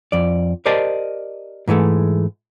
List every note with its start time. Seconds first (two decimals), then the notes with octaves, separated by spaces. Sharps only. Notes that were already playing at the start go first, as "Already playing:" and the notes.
0.12 F2 D5
0.65 G4 A#4 C5 D5 D#5 A5
1.68 G#2 E3 G#3 A3